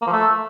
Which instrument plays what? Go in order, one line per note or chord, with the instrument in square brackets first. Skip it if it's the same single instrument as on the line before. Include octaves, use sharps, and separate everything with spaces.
[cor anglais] A#3
F3
A3